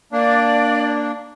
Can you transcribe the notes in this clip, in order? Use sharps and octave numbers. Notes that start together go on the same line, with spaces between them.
A#3 D4 D5